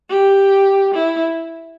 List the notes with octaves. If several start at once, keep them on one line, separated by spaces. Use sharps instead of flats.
G4
E4